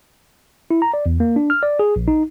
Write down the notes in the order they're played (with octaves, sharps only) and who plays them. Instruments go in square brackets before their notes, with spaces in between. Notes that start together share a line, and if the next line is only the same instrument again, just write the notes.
[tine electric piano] E4
A#5
D5
E2
A#3
D4
F6
D5
G#4
A#1
D#4